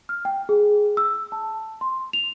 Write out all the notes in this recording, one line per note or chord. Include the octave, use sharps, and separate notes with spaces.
F6
G5
G#4
E6
A5
C6
F7